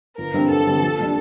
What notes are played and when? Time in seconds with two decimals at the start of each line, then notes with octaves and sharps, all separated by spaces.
0.18 G1 A#4
0.34 G2 D3 G3 C4
0.50 G1 A4
0.66 G2 D3 G3 C4
0.82 A#1
0.98 A#2 G3 D4